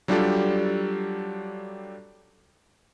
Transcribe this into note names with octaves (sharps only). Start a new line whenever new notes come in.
F#3 G3 D4 F4 G4 A4